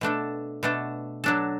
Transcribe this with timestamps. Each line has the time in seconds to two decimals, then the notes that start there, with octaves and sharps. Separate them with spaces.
0.01 B2 A3 D4 A4
0.63 B2 A3 D4 A4
1.24 F#3 D4 A4